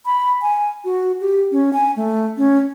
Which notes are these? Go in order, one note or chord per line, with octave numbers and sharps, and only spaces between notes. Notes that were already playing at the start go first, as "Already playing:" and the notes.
B5
G#5
F#4
G4
C#4
G#5
A3
C#4